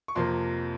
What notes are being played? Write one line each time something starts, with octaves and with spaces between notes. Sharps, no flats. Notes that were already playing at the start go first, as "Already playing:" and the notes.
C#6
F2 C3 F3 A#3 C6